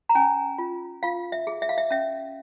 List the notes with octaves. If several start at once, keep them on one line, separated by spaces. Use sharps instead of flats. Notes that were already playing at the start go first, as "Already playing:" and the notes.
A#5
C#4 G#5
F4
F4 F5
E5
G#4
E5
F5
E5
C#4 E5